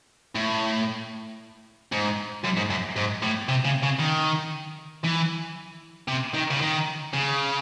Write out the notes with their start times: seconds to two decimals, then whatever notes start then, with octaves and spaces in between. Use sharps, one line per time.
0.35 A2
1.92 G#2
2.44 F#2
2.57 G#2
2.70 F#2
2.96 G#2
3.22 A2
3.49 C3
3.65 C#3
3.83 C#3
4.00 D#3
5.04 E3
6.08 C3
6.34 D#3
6.51 C#3
6.61 D#3
7.13 C#3